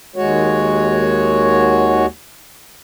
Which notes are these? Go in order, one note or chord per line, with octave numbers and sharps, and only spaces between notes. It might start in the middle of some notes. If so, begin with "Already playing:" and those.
D#2 G#3 F#4 C#5